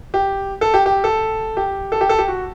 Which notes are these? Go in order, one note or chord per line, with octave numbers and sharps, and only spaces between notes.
G4
A4
G4
G4
A4
G4
A4
G4
A4
G4
F#4